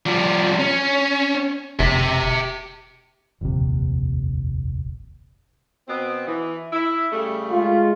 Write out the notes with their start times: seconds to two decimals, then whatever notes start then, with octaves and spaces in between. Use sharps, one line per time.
0.06 F3 G3
0.59 C#4
1.79 F1 G4 E5
3.41 F1 A#1 D#2 C3
5.88 B2 B3 C4
6.26 E3
6.72 E4
7.12 C#3 G3 A3
7.51 G#3 F4